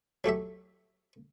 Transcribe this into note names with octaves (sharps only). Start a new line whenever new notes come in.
F#3 A3 G4 E5